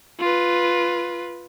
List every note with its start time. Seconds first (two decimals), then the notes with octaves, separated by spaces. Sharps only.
0.20 F4 B4